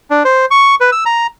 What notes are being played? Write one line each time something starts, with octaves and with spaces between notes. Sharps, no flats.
D4
C5
C#6
B4
E6
A#5